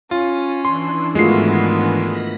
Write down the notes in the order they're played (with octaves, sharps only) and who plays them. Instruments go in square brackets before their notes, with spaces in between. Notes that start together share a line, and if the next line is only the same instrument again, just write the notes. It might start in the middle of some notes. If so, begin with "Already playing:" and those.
[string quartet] C#4 [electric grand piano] F4
[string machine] E3 D4 E4 [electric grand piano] C6
[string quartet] G#2 D#3 B3 [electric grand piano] G#3 C7 [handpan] A3 F4 F#4
[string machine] B5 A#6